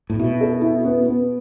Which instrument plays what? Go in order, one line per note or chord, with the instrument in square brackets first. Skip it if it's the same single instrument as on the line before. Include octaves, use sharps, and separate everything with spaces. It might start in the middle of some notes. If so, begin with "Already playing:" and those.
[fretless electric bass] A2
[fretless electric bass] B2 [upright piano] E4
[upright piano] A4
E4
B3
B3